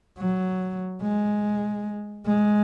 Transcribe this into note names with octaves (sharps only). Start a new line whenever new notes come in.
F#3
G#3
G#3